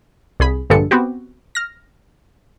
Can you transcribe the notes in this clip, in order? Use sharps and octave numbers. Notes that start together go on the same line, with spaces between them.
C2 G#4 B5
A#1 G2 D3 G#3 A4 C#7
B3 C4 F#4 G4
F6 A#6